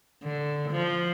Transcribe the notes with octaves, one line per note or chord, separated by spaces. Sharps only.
D3
F3